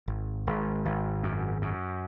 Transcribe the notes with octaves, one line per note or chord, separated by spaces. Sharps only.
G#1
G#1
G#1
F#2
F#2